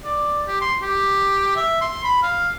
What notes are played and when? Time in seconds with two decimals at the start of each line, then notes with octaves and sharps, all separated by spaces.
0.05 D5
0.48 G4
0.61 C6
0.82 G4
1.56 E5
1.81 C6
2.04 B5
2.23 F5